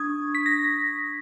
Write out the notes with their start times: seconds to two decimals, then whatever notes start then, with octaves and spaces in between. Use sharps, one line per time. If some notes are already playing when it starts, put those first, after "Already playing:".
Already playing: D4 C#6 D#6 G#6
0.35 B6
0.46 A#6